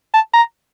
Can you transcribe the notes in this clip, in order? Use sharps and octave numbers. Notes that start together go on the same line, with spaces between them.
A5
A#5